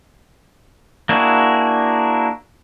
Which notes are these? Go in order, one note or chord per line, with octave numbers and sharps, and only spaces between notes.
A#3 D4 E4 F#4 G#4